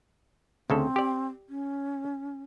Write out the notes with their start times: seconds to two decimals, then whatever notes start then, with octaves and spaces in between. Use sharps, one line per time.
0.70 D2 C#3 C4 A4
0.96 G4 D5
1.49 C#4